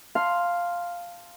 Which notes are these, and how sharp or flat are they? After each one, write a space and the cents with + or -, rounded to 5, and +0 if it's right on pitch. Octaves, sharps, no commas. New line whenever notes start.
F5 +0 A5 +5 C6 +0